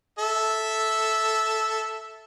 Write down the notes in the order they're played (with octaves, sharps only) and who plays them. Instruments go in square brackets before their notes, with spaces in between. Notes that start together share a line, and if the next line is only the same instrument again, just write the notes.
[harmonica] A4 E5